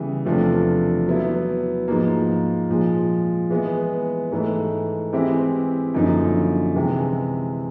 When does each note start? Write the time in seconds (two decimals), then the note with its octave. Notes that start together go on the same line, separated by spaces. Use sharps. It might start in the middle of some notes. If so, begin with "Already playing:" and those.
Already playing: C#3 E3 G3 B3
0.25 E2 C3 F3 A3 D4
1.07 F#3 B3 E4
1.88 G#2 F3 A#3
2.70 A#2 F3 G#3
3.50 E3 G#3 B3
4.32 G#2 E3 A3
5.13 E3 G#3 C4 E4 G4
5.94 F#2 D3 F3 A#3 D#4
6.76 C3 E3 G#3